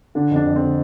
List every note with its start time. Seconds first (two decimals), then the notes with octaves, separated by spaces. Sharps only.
0.15 D3 D4
0.31 F2 D4
0.46 F2
0.56 C4
0.61 D3